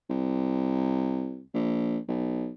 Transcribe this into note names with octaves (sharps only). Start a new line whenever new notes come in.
C2
A#1
B1